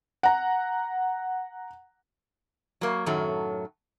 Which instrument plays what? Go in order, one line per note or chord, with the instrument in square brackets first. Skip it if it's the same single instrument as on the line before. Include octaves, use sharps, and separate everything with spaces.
[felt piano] F#5 A#5
[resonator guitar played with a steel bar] F#3 A#3
F#2 A2 D#3 F#3 A4